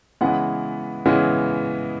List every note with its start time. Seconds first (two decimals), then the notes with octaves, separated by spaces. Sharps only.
0.21 C#3 E3 G#3 B3 F#5
1.06 C#3 E3 G#3 B3